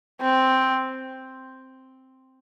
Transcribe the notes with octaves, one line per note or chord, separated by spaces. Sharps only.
C4